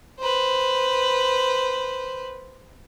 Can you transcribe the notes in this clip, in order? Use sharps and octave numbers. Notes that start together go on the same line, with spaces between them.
B4 C5